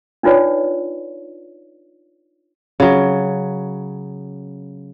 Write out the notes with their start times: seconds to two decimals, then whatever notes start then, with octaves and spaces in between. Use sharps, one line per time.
0.23 D4 D#4 F4 B4 C#5 D5
2.80 C#3 F#3